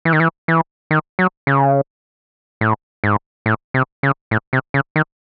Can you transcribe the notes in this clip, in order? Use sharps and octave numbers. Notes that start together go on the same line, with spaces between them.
E3
D#3
E3
E3
D#3
F#3
C#3
A2
G#2
A2
C3
C#3
A2
C3
C#3
D#3